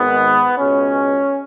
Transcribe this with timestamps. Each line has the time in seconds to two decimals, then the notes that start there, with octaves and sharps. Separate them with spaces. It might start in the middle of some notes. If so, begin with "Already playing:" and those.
Already playing: G#1 G#2 D#3 G#3 B3
0.58 C#2 B2 G#3 C#4